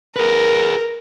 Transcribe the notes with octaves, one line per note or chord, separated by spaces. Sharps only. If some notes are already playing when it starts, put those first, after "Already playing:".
G#4 A#4 B4